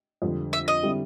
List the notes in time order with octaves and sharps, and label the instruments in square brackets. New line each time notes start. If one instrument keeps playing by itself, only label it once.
[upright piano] F2 D3 G3
[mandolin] E5
D#5
[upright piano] D3 G3 C4 E4